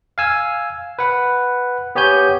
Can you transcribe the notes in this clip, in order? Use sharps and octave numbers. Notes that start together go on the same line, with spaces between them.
F5 G#5 E6
B4 F#5
B3 G4 C#5 G#5 G6